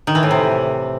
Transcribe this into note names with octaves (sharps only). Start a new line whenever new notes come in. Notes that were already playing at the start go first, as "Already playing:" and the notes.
D#3
E3
A2
C3